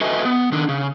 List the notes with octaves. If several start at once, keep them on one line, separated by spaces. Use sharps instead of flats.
F#4 A4 B4 D#5 E5 G#5
B3
D#3 D4
C#3